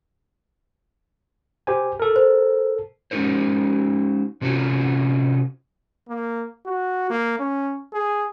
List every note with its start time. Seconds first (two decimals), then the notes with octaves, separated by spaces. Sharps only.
1.67 G4 C5 G#5
2.00 A4 A#4
2.16 C5
3.11 G#3 C#4 D#4 A#4 C5
4.41 C3 C4 C#4 F4 F#4 A4
6.09 A#3
6.66 F#4
7.10 A#3
7.39 C#4
7.93 G#4